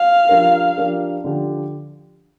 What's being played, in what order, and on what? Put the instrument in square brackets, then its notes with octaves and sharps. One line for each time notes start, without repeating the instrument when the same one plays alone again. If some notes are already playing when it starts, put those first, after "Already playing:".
Already playing: [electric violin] F5
[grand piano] F3 D4 G4 A#4
F3 D4 G4 A#4
D3 F3 D4 G4